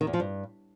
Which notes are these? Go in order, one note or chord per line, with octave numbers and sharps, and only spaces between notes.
D#3
E2
F3
G2